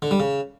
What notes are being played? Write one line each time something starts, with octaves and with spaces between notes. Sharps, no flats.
D3
G3
C#3